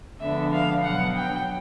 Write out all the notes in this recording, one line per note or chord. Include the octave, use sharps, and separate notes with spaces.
D3 F3 G#3 B3 D4 E5
F5
B2 F#3 B3 D4 F#5
G5